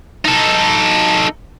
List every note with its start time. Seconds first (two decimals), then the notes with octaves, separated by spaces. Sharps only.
0.25 D#4 A4